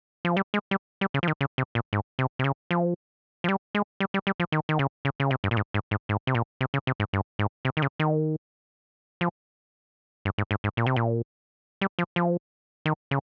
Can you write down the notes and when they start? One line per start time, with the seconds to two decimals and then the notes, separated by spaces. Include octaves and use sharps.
0.25 F3
0.37 G3
0.54 G#3
0.71 G3
1.01 G3
1.14 C#3
1.23 F3
1.28 D#3
1.41 C#3
1.58 C3
1.75 A#2
1.93 G#2
2.19 C3
2.39 C3
2.44 C#3
2.71 F3
3.44 F3
3.48 G3
3.75 G#3
4.00 G3
4.14 G3
4.27 G3
4.40 F3
4.52 D#3
4.69 D#3
4.79 C#3
5.05 C#3
5.20 C#3
5.31 C3
5.44 G2
5.51 A#2
5.57 G#2
5.74 G#2
5.91 G#2
6.09 G#2
6.27 C3
6.35 A#2
6.61 C3
6.74 C#3
6.87 C3
7.00 G#2
7.13 G2
7.39 G#2
7.65 C3
7.77 D#3
7.82 C#3
8.00 D#3
9.21 F3
10.25 G2
10.38 G#2
10.51 G#2
10.64 G#2
10.77 A#2
10.86 C3
10.96 A#2
11.81 G3
11.99 F3
12.16 F3
12.86 D#3
13.11 C#3